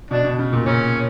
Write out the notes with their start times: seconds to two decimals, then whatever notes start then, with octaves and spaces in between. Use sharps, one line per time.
0.11 B2 D4
0.24 B2
0.39 C#3
0.53 A#2
0.66 A#2 C#4